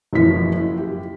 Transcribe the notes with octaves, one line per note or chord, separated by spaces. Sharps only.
F#1 F#2 E3 F3 E4 B6
G4